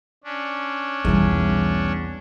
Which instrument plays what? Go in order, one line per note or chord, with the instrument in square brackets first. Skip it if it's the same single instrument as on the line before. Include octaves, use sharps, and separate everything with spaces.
[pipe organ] C#4 D4
[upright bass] B1 G3 [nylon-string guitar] E2 G#5